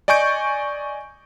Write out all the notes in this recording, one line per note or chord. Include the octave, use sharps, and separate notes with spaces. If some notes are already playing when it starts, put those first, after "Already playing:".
D5 D#5 G#5 C#6 G6 D7